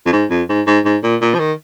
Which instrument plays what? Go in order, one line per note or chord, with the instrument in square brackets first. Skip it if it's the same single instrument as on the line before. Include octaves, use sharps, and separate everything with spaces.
[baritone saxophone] F2
G#2
F2
G#2
G#2
G#2
A#2
A#2
F3
D#3